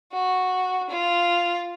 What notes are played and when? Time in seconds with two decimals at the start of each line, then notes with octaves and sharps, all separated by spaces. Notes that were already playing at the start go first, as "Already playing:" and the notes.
0.12 F#4
0.89 F4